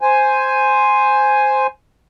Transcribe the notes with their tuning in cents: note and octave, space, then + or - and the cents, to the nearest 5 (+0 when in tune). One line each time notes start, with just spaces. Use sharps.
C5 +0 G#5 +0